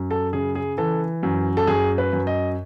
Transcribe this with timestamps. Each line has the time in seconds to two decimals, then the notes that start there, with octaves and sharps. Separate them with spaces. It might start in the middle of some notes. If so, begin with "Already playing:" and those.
Already playing: F#2
0.11 A4
0.33 C#3 G#4
0.55 G#4
0.78 E3 A4
1.23 F#2
1.57 A4
1.67 F#2 G#4
1.98 B4
2.13 F#2
2.27 D#5